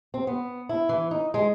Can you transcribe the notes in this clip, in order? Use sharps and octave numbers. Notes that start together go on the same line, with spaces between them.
C4
B3
E4
E3
D#4
G#3